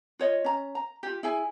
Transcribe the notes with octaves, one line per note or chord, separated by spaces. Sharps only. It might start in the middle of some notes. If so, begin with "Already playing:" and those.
F4 C#5 D#5
C#4 A#5
A#5
F4 G4
E4 G#4 G#5